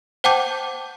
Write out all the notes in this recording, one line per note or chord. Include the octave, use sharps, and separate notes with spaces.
C5 F#5 G5 A5 D6 G6